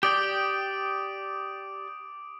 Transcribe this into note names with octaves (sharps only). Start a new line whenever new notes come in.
G4 D5 G5 D6 D#6 D7